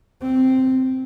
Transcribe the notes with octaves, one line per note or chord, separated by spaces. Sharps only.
C4